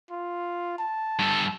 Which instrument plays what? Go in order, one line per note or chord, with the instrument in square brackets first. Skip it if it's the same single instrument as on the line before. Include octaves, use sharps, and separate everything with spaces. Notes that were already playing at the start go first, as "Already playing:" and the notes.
[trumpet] F4
A5
[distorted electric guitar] G2 A4